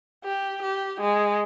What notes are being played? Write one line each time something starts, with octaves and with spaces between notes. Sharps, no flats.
G4
G4
G#3